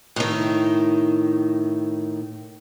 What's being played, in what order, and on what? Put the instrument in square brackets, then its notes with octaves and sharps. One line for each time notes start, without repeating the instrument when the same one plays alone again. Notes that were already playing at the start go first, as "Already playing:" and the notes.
[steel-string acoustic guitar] A2 D#3